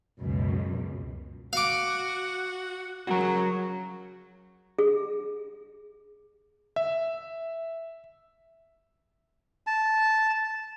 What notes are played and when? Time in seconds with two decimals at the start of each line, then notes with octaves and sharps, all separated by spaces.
0.20 C#2 F#2 B2
1.53 F#4 F5 D6
3.07 C#3 F#3 F#4 A#4
4.79 G#4
6.76 E5
9.67 A5